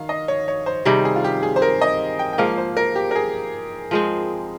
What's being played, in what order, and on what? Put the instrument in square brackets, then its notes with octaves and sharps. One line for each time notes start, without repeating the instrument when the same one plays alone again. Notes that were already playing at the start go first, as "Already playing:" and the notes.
Already playing: [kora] D#3 [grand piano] F5
[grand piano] D#5
C#5
C#5
C5
[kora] C3 D#3 G3 [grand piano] G#4
[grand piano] G#4
F4
G4
G#4
C5
A#4
D#5
G5
G5
[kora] G#2 F3 A#3 [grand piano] F5
[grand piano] C5
A#4
G4
A#4
G#4
[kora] F3 G#3 C4